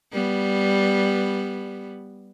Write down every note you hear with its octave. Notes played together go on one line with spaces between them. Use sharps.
G3 B3